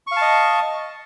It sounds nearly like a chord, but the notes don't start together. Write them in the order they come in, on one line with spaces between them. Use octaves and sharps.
C#6 F5 A5 D#5